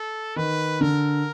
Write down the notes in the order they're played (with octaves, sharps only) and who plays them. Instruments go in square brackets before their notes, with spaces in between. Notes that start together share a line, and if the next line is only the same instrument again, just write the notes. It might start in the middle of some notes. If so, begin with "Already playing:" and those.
Already playing: [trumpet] A4
[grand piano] D#3 [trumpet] B4
[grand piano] D3 [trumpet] A#4